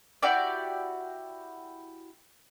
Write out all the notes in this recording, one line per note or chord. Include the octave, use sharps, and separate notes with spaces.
E4 F#4 G4 D5